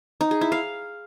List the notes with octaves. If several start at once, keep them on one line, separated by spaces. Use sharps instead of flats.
D#4
G#4
E4
F5